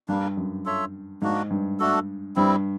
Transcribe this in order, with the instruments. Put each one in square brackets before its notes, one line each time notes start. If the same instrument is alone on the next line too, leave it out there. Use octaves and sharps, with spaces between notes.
[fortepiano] G2 [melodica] G3 A#3 D4
[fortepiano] F#2
[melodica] F4 A4 C#5 E5
[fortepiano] G#2 [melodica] A#3 D4 F#4
[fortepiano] G2
[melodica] A3 D4 F#4 A4
[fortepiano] G2 [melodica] G3 C4 E4